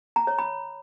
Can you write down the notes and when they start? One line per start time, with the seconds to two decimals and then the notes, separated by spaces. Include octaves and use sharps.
0.16 A#5
0.27 C#5
0.39 B5